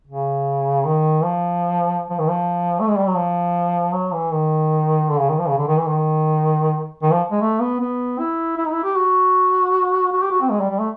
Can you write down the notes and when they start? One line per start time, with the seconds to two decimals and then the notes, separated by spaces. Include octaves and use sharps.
0.07 C#3
0.85 D#3
1.23 F3
2.10 F3
2.19 D#3
2.29 F3
2.80 A3
2.88 G#3
2.98 G3
3.07 F#3
3.17 F3
3.93 F#3
4.13 E3
4.32 D#3
5.10 D3
5.19 C#3
5.29 D#3
5.39 F3
5.48 C#3
5.58 D3
5.68 D#3
5.77 E3
5.86 D#3
7.02 D#3
7.12 F3
7.31 G#3
7.41 A3
7.60 B3
7.80 B3
8.19 E4
8.57 E4
8.65 D#4
8.72 E4
8.84 G4
8.96 F#4
10.12 F#4
10.22 G4
10.31 F#4
10.41 C4
10.51 G#3
10.60 G3
10.70 G3
10.79 A3